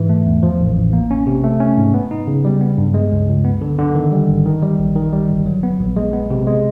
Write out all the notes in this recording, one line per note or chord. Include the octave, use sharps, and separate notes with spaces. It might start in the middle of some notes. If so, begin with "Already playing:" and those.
Already playing: G#2 E3
A3
E2
F3
A1
A1
A#3
C#4
C3
A3
C#4
G#2
B3
D#4
C#3
G3
B3
G2
G#3
C#2
C#2
B3
D3
D3
D#3
G3
G#1
D#3
G3
A#1
D#3
G3
G1
F#3
B3
A#1
G#3
B3
C3
G#3